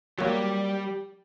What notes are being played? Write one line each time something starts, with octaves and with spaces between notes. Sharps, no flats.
F#3 G3 A#3 G4